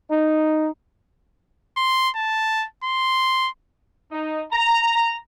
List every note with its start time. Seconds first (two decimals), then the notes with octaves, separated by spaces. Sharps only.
0.10 D#4
1.77 C6
2.16 A5
2.84 C6
4.12 D#4
4.52 A#5